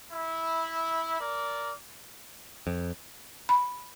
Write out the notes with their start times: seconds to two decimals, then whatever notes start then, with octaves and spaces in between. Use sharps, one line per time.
0.11 E4
1.20 A#4 D5
2.67 F2
3.49 B5